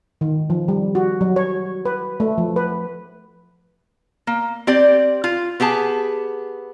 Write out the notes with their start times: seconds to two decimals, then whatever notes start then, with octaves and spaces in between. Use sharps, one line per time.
0.21 D#3
0.50 F3
0.68 G3
0.95 F#4
1.21 F#3
1.36 C#5
1.85 B4
2.20 A3
2.38 F3
2.56 B4
4.27 A#3
4.67 C4 G4 D5
5.24 F4
5.60 B3 G4 G#4 A5